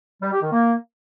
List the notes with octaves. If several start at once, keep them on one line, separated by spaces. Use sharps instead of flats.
G3
G4
D#3
A#3